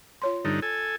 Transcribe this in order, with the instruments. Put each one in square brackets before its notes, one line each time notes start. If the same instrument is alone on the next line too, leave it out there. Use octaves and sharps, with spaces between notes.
[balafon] F4 C#5 C6
[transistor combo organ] G2 D3 D#4
A4 G#5